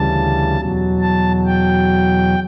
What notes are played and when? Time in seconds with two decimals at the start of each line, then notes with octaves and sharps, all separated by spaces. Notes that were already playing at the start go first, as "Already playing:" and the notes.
Already playing: D2 C#3 E3 G3 A5
0.56 E2 B2 F#3
1.01 A5
1.46 G5